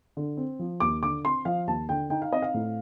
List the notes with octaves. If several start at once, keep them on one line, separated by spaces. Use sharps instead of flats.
D3
C4
F3
D#2 D6
D3 D6
C4 C6
F3 F5
D#2 A5
D3 G5
D#4 G5
F5
C4 D#5
F5
A2